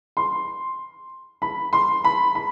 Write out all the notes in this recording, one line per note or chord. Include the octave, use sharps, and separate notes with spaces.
C6
B5
C6
B5
B5